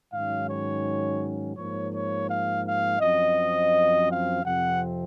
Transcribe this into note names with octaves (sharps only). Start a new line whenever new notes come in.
G#2 D#3 F#3 C#4 F5
C#5
G#2 F3 A#3 C#5
C#5
F5
F5
F#2 F3 C4 D#5
F5
F2 C3 F3 C4 F#5